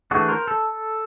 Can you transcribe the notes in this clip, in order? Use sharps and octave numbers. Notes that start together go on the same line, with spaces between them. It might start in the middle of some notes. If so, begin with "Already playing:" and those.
E3 A3 D4 F#4 G#4
A#4 C5
A4